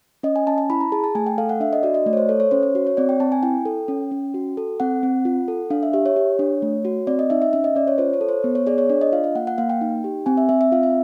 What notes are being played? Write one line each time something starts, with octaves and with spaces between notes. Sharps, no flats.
C#4 D#5
G#5
C#4 A5
A5
E4 B5
A#5
G#4 A5
A5
A3 G#5
G5
A4 F5
F#5
D4 E5
D#5
F#4 D5
D#5
A3 D5
C#5
C5
A4 C#5
C#5
C#4 C5
C#5
F#4
C#5
C4 D5
G5
C4 A5
G#5
E4 G5
A4
C#4
C#4
F#4
A4
C4 F#5
C4
F4
A4
D4 F5
E5
G4 E5
C#5
G4
D4
A3
F#4
C4 D5
D#5
D#4 E5
E5
C#4 E5
D#5
C#4 D5
C#5
F4 C5
C#5
A4
C5
B3
C#5
G#4 D5
C#5
D4 D5
D#5
F4 F5
F5
A#3 F#5
F#5
A#3 F5
G5
D#4
G4
C4 G#5
E5
C4 E5
E5
F4 F5
E5